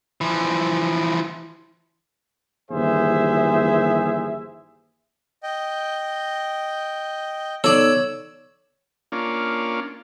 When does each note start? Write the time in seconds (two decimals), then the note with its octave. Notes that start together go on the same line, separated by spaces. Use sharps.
0.21 E3 F3
2.70 G1 D#2 E3 G#4 C5 E5
5.43 D#5 G5
7.64 B3 D#4 A4 C#5 D5 E6
9.12 A#3 C#4 D4 F4